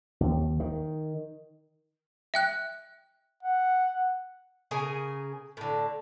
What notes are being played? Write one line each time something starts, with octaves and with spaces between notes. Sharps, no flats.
D#2
D#3
E5 G5 F#6
F#5
C#3 G#4 A#4 G#5
A2 D3